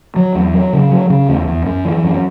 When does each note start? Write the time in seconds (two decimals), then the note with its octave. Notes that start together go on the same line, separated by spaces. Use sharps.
0.16 F#3
0.35 E2
0.54 F#3
0.73 C#3
0.91 F#3
1.10 C#3
1.29 E2
1.47 E2
1.65 F#2
1.85 E3
2.04 F#2